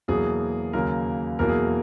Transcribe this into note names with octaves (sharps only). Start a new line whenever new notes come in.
E2 B2 F#3 A#3 G#4
D#2 C#3 F#3 A#3 A#4
E2 B2 F#3 A#3 A#4
G#4